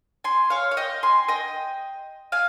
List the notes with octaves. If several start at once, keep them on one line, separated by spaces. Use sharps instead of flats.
G#5 C6
C#5 F5
F5
D#5 G5
G#5 C6
D#5 G5
F5 G#5